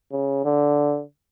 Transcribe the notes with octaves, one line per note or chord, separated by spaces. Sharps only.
C#3
D3